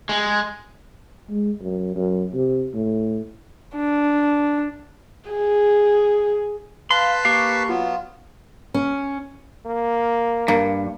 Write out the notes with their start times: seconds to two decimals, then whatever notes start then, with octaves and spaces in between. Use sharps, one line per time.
0.09 G#3
1.29 G#3
1.62 F#2
1.96 F#2
2.34 C3
2.74 A2
3.76 D4
5.30 G#4
6.91 B4 F5 A5 B5 C6
7.25 A#3 G4 F5 C#6
7.69 F#3 B3 F4
8.74 C#4
9.66 A#3
10.48 G2 A#3